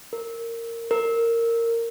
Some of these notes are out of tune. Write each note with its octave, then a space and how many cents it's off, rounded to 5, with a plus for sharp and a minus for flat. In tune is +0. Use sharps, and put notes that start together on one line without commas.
A#4 -15
A#4 -15